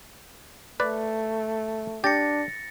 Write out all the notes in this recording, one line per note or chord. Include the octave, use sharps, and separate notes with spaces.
A3 B4 D5
D4 G4 A6 A#6 C#7